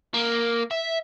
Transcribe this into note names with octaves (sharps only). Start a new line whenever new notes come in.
A#3
E5